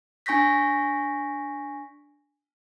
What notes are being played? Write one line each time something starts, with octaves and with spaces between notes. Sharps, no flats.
D4 G#5 C#6 G6 A#6 B6